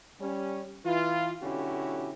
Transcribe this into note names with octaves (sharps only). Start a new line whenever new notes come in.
G3 C#4
E3 F4
B1 D3 C#4 E4 F#4 G4